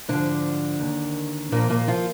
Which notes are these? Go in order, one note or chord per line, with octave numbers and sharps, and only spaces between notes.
G#2 D3 F3 D4
D#2 D#3
D#2 A#2 D3 F3 A#3
A#2 A#3
F3 F4